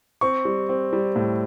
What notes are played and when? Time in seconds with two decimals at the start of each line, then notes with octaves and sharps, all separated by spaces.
0.21 C4 C#6
0.45 G3
0.69 C4
0.93 G3
1.16 A2